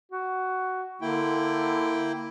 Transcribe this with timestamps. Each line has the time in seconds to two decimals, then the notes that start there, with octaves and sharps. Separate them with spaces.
0.12 F#4
1.01 D3 A#3 E4 G5